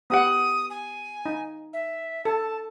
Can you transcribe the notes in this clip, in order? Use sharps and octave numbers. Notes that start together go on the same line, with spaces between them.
B3 G4 F#5 D#6
G#5
D#4
E5
A4 A5